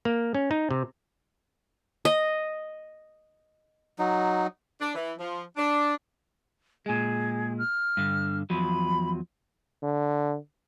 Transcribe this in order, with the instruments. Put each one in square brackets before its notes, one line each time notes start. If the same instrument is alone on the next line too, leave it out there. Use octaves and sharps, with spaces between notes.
[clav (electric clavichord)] A#3
C#4
D#4
C3
[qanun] D#5
[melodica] F#3 D#4
[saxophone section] D4
E3
F3
D4
[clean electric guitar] A#2 G#3 [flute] G#4
[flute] F6
[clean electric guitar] G2 D3
[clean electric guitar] E2 F3 F#3 [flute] B5
[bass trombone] D3